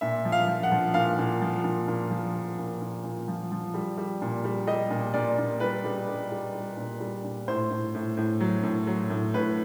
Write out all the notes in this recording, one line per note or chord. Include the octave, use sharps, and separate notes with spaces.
A#2 E5
F3
F5
F3
F#5
F3
A#2 F5
A#2
F3
A#2
A#2
F3
F3
A#2
A#2
A#2
F3
F3
G3
G3
A#2
G3
G3 D#5
A#2
A#2 D5
A#2
G3 B4
G3
G3
G3
G3
A#2
G3
A#2
A2 C5
A2
A2
A2
F#3
A2
F#3
A2
A2 B4